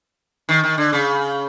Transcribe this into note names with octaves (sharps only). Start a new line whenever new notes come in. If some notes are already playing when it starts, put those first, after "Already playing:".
D#3
D#3
D3
C#3